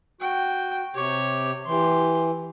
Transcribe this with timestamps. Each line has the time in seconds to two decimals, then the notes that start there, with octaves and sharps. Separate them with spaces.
0.21 F#4 G5
0.96 C3 G4 C#5
1.67 E3 G4 C6